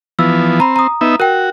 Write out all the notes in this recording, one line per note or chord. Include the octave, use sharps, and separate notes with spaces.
E3 F3 B3 E6
C4 A#5 B5
A#5 D#6
B3 D#4 E5
F#4 A#4 G5